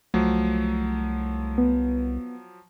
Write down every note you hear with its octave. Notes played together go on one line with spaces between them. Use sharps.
C2 F3 F#3 A3
B3